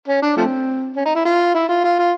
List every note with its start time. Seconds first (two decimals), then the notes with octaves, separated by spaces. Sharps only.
0.08 C#4
0.22 D4
0.37 F3 A3 C4
0.95 C#4
1.05 D#4
1.15 E4
1.25 F4
1.54 E4
1.69 F4
1.84 F4
1.98 F4